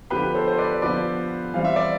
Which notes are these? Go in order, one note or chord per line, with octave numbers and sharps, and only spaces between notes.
D3 F3 B3 G4 B4
A4 C5
C5
B4 D5
D3 F3 B3 B4 D5
E3 G3 C4 F5
E5
D5